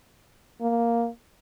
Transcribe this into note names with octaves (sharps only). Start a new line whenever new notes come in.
A#3